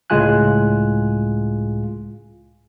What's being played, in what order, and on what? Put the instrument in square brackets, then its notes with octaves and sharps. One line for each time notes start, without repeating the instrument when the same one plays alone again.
[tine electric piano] C#2 A2 G#3 F4 G#5 F#6